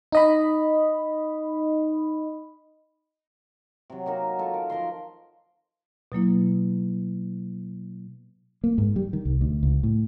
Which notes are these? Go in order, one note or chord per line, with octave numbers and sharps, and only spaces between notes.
D#4 D#5 B5
C3 F#3
A#3 D#4 F#4 A#4
F4 A4 C#6
A#4
F3 A#4 A#5 C6
B2 F#3 A#3 E4
A#3
G#2
G3
D#3
C2
D2
C#2
A2